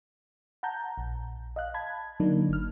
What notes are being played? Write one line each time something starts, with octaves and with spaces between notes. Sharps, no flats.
F#5 A5 A#5 G6
A#1
D#5 F5 F#6
A5 B5 G#6
D3 F#3 A#3 D4 D#4
G1 F6